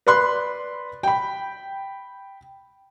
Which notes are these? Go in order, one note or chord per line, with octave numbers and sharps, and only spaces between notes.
B4 D5 B5 C6 F#6
G5 B5